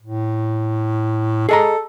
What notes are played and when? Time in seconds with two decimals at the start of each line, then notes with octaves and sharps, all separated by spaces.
0.02 A2
1.49 G#4 A4 D#5 A#5